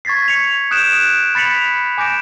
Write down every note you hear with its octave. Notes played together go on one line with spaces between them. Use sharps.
C#6 G#6 A6 B6 C7
C#7 F7
D#6 F#6 G6 D7 E7
B5 A6 B6 C#7 F7 F#7
G#5 D6 G6 A#6 D7 E7